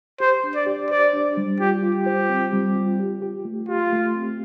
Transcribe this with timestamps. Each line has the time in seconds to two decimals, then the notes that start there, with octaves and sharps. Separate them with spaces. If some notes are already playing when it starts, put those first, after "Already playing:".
0.20 G4 C5
0.44 D4
0.55 D5
0.67 G4
0.90 C5 D5
1.13 D4
1.37 G3
1.59 F4 G4
1.83 F4
1.95 G4
2.06 C5
2.29 C4
2.53 G3
2.76 F4
2.99 G4
3.22 G4
3.45 A3
3.69 F4 G4
3.93 A3
4.15 C4